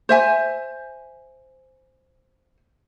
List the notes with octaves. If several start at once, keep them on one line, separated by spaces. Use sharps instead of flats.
C5 E5 G#5